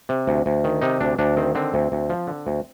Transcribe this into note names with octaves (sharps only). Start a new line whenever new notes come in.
C3
D2
D2
D#3
C3 D#4
D2 D4
D2 D4
D#3 C4
D3 C4
D2
D2
F3
D3
D2